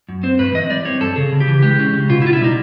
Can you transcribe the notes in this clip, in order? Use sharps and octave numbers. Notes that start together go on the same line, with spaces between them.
F#2
C4 C5
G2 B4
E3 D#5
G3 D5
C4 C#5
G2 A4
C#3 G#4
C#3
G4
E3
G#3 G4
C#3
C#3
B2 F4
E4
B2 F4
E4
G3 D#4